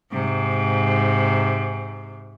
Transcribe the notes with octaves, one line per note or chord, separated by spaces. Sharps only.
G#2 C3